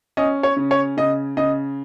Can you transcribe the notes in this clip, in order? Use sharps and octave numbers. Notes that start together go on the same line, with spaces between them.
C#4 D#5
C#5
C#3
C#5
C#3 D#5
C#3 D#5